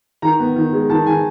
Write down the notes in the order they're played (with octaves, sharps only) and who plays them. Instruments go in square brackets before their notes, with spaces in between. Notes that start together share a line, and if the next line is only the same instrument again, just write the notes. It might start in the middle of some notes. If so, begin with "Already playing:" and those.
[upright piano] D#3 A#5
B3
D#3
G#3
D#3 A5
D#3 G#5